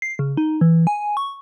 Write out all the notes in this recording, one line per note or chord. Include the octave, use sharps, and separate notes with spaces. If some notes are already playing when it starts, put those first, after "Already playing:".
C7
C#3
D#4
E3
G#5
C#6